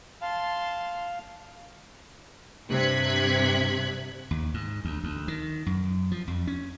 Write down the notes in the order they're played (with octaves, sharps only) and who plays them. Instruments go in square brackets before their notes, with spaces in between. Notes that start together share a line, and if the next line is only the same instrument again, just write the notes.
[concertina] F5 [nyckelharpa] A5 C6
[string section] G2 C3 F#6 G#6 B6
[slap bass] D#2
G#2
D2
D2
D#3
F#2
F3
F2
C#4